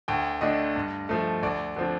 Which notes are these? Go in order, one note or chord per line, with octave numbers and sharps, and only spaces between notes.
D2 G5
D3 A3 D4 D#5
G2
F3 A3
D2 D5
D3 F3 C4